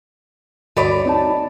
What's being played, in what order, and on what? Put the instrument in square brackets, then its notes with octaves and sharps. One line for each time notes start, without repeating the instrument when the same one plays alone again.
[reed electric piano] D2 G2 F#4 [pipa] B4 C#5 D5
[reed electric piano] C4 D#4 A5